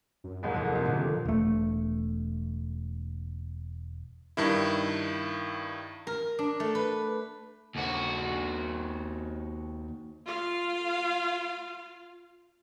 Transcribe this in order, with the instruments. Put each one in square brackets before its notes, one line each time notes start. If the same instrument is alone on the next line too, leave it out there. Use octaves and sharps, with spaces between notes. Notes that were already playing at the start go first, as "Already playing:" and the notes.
[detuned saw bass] F#2
[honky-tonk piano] F#1 D#2 G#2 [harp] G#4
[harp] F1 D#5 [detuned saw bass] F2
[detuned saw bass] C3 [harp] A3 F4
[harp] A#2 D3 D#3
[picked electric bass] E1 A3
[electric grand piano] G2 D#3 E4
[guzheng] A#4
D4
A3
B4
[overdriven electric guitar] D#2 F#4
[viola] F4 F5